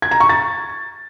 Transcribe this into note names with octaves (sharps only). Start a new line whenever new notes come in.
G#6
A#5
C#6
A6